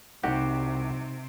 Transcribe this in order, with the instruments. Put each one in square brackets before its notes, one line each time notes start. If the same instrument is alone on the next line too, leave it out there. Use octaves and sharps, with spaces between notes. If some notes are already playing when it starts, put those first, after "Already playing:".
[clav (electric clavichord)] C2 F#4 G4 [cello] C3 [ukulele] D#4 F#5